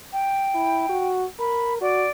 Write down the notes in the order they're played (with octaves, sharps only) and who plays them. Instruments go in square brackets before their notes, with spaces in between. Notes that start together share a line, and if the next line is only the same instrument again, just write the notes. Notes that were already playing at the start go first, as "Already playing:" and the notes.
[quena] G5
[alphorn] E4
F#4
[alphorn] A#4 [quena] B5
[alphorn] F#4 [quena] D5